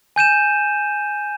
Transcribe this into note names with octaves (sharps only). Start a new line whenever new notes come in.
G#5 G6 D#7 E7